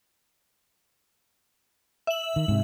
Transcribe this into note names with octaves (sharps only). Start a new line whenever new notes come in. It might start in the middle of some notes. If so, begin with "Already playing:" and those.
E5 F#7
D#3
G#2 C3